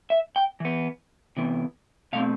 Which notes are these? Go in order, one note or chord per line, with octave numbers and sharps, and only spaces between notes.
E5
G5
E3 B3
C3 E3 B3
B2 A3 C4 F5